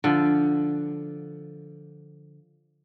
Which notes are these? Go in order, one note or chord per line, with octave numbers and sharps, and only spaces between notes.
D3 F3